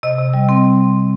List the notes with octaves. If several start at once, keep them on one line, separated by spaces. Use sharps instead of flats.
C3 D#5
C3
G3
C4